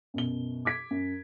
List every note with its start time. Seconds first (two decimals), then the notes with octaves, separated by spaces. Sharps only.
0.14 F#2 B2 G7
0.65 D6 G#6 B6 D7
0.91 F#2